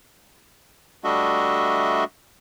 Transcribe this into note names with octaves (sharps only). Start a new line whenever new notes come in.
G3 A3 D4 F#4 D#5 E5